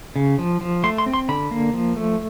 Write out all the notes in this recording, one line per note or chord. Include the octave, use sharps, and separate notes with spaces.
C#3
F3
F3
A3 C6
C6
C4
C6
D3 B5
A#3
F3
A3